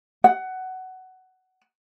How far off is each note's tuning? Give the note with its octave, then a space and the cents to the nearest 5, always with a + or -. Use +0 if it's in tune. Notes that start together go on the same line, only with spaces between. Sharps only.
F#5 +15